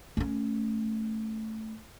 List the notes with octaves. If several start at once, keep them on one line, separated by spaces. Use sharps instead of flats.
A3 C#4